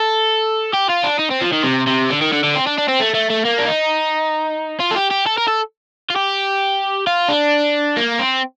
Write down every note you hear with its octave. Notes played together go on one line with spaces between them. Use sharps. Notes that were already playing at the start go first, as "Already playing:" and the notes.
Already playing: A4
G4
F4
D4
D#4
C4
F3
D#3
C3
C3
D3
D#3
D3
D3
C4
D4
D4
C4
A3
A3
A3
A#3
D4
D#4
F4
A4
G4
G4
A4
A#4
A4
F4
G4
F4
D4
A#3
C4